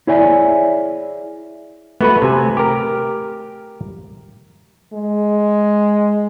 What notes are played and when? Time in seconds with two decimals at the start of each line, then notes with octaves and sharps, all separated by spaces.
0.07 E4 G#4 C#5 D5 E5 G#5
2.01 A3 B3 F#4 B4
2.22 C3 G#5
2.57 G4 A#4
4.93 G#3